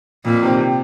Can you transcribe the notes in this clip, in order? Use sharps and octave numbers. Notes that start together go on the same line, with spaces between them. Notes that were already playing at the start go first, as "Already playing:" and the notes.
F2 A#2
C3 D#3 C4 G4
C3